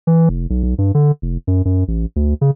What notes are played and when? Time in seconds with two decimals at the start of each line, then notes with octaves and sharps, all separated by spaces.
0.07 E3
0.29 F1
0.50 B1
0.63 B1
0.78 G2
0.95 D3
1.22 F1
1.47 F#2
1.65 F#2
1.88 A1
2.16 D2
2.41 C#3